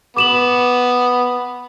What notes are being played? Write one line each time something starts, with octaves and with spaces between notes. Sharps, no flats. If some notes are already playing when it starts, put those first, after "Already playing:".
B3 D6 E7 F#7